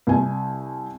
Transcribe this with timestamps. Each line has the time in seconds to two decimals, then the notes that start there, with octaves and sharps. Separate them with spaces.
0.07 C2 G#5